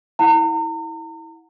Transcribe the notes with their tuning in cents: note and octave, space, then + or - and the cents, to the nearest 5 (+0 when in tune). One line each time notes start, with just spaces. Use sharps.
E4 -20 F#5 -15 A#5 -40